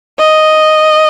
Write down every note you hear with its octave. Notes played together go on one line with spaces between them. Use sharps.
D#5